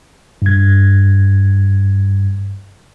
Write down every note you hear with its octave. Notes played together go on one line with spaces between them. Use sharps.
G2 G#6